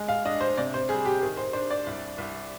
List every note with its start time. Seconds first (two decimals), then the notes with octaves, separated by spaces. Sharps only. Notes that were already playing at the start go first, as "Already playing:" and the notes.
Already playing: G#3
0.08 F5
0.25 D4 D#5
0.41 C5
0.57 C3 D5
0.74 C5
0.89 G3 G#4
1.05 G4
1.22 D#3 G#4
1.37 C5
1.53 D4 C5
1.71 D5
1.87 C2
2.18 C2